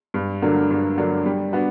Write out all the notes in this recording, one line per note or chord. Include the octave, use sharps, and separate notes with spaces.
G2
D3 F#3 A#3 D4
G2
D3 F#3 A#3 D4
G3
B3 D4 F#4